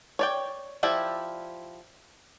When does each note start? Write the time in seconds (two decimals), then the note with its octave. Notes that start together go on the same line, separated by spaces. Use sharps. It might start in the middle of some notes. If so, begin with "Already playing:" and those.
0.19 C#5 D5 G5
0.83 F3 E4 G4 D5